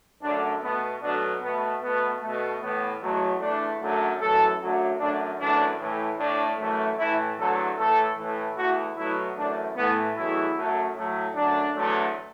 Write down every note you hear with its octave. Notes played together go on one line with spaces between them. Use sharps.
F#2 D3 A3 D4
B2 A3 B3
B2 F#3 A3 D4
B2 A3 B3
B2 A3 B3
B2 A3
A2 E3 A3 B3
E2 B2 F#3 A3
E2 E3 A3 D4
F#2 D3 F#3 A3
F#2 E3 A3 A4
F#2 D3 F#3 A3
F#2 D3 A3 D4
F#2 E3 A3 D4
A2 E3 A3
A2 A3 D4
F#2 E3 A3
A2 E3 A3 E4
E2 D3 F#3 A3 A4
A2 E3 A3 A4
A2 E3 A3
E2 E3 A3 F#4
B2 F#3 A3 E4
F#2 E3 A3 D4
A2 E3 A3 B3
E2 B2 F#3 A3 E4
F#2 F#3 A3
A2 F#3 A3
F#2 F#3 A3 D4
E2 D3 F#3 A3